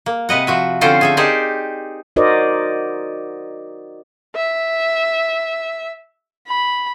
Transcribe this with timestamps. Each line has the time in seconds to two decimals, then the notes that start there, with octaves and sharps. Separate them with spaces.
0.06 A#3
0.29 C3 B4 D#5 F#5
0.47 F3 F#4 E5
0.81 D3 C4 C#4 F4 A4 C5
1.01 G#4 A4 E5
1.17 D#4 G4 G#4 A#4 C5 D5
2.16 D#4 F#4 A#4 C5 D5 D#5
4.36 E5
6.47 B5